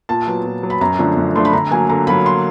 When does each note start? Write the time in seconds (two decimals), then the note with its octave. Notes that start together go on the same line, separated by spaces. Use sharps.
0.09 A#2 A5
0.27 F#3 B3
0.45 A#2
0.63 F#3 B3
0.70 B5
0.81 F#2 A#5
0.98 D3 F3 A3 D4
1.17 F#2
1.35 D3 F3 A3 D4 C6
1.45 B5
1.53 D3 A#5
1.71 F#3 A#3 G#5
1.89 D3 A#5
2.07 F#3 A#3 B5
2.26 C6